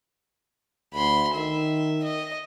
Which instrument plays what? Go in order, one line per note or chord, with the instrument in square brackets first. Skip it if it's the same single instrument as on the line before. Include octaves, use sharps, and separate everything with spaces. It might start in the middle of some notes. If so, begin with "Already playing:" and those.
[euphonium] D2 [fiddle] B5 C6
[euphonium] D#3 [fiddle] E5
[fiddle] D#5